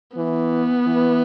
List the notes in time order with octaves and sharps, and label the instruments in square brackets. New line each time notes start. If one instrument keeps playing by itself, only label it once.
[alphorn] E3 [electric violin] B3
[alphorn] E3